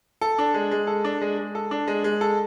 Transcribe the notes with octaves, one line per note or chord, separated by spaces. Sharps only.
A4
D4
G#3
G#3
A4
D4
G#3
G#3
A4
D4
G#3
G#3
A4